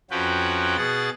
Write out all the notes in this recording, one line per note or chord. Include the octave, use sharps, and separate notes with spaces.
F2 F3 C#4 F#4 B4 G5
B2 G#4 F#5 A6